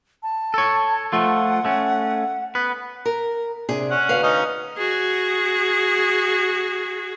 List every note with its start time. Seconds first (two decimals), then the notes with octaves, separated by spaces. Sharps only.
0.23 A5
0.54 A4 C#5
1.12 F3 A3 F4 F#5
1.65 A3 C#4
2.55 B3 B4
3.05 A#4
3.69 C3 D4 G#4
3.91 C#4 F#5
4.09 D2 B4 F5
4.23 C#4 D#4 D#5
4.78 F#4 G#4